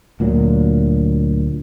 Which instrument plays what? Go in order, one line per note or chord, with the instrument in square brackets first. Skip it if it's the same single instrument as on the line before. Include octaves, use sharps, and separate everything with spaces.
[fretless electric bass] D2 A#2 F#3